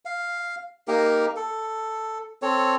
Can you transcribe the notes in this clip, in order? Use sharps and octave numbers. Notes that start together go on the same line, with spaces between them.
F5
A#3 D#4 G4 A#4
A4
C4 A4 C#5